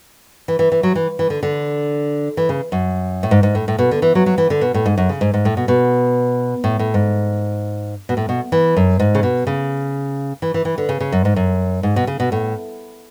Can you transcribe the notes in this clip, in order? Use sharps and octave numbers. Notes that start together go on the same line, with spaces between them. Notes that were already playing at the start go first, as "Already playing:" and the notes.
E3
E3
E3
F#3
E3
E3
D3
D3
E3
C#3
F#2
A2
G#2
G#2
A2
A2
B2
D3
E3
F#3
F#3
E3
D3
B2
A2
G#2
F#2
C#3
G#2
G#2
A2
B2
B2
A2
A2
G#2
B2
A2
B2
E3
F#2
G#2
C#3
B2
C#3
E3
E3
E3
D3
C#3
C#3
F#2
G#2
F#2
G#2
B2
C#3
B2
A2